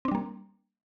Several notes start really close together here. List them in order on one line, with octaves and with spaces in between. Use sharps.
C4 D4 G3 A#3